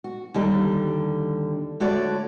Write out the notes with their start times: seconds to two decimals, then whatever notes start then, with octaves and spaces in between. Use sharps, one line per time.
0.04 F#4
0.34 D#2 D3 G3
1.80 D3 A3 F#4 C#5 D5